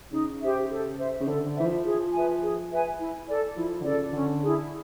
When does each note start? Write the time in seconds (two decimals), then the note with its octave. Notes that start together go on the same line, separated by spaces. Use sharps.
0.12 C#3 D#4
0.41 G4 C5 E5
0.70 A4
0.98 C5 E5
1.21 C#3
1.27 D3 A4
1.46 D3
1.56 E3 C5 E5
1.65 F3
1.85 G#4
2.13 B4 E5 G#5
2.41 G#4
2.70 B4 E5 G#5
2.99 E4
3.28 A4 D5
3.56 F3 E4
3.81 D3
3.85 C#3 A4 D5
4.13 D3 C#4
4.43 E4 G#4